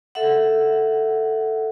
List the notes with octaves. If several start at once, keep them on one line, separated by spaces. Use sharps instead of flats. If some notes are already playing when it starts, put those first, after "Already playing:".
A4 E5 F#5